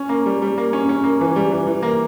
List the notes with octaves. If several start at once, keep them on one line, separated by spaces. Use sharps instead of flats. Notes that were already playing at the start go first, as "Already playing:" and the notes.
Already playing: C#4
A#3
G3
G3
A#3
C#4
C#4
A#3
E3
G3
E3
E3
A#3